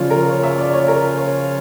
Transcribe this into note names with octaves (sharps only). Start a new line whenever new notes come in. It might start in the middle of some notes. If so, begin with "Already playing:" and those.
Already playing: C#3 F3 C#4 F4 C#5 D5
A#4
C#5
E5
D5
C#5
A#4
C#5